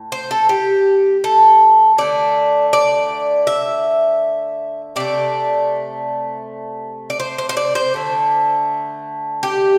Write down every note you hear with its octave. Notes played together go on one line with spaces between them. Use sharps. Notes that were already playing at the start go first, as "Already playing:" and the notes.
Already playing: A2
C5
A4
G4
A4
D3 A3 D5
D5
E5
C3 A3 D5
D5
C5
C5
C5
D5
C5
D3 A3
G4